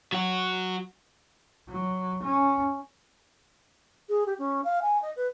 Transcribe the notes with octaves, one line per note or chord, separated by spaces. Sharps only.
F#3 F#4
F#3
C#4
G#4
G4
C#4
F5
G#5
D#5
B4